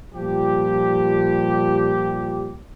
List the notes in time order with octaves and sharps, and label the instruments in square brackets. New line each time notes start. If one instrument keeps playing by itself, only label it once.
[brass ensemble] A#2 F3 G3 G4